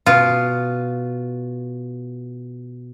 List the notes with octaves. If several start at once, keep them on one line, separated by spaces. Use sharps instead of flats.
B2 F4